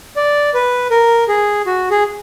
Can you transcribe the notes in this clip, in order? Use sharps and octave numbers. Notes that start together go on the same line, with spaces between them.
D5
B4
A#4
G#4
F#4
G#4